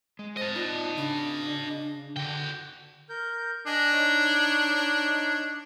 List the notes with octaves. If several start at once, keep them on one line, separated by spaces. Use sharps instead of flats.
G#3
C5 D#5 A5
D#4 F4 D5
C#3 D4
D3 F#4 G5
A#4 G6
D4 D#5 G#5
D#4 C#5